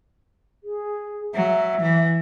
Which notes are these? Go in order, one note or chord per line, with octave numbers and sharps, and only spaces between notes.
G#4
F#3 E5
E3